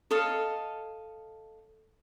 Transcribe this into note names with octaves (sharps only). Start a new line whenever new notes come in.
A4 C#5 D#5 F5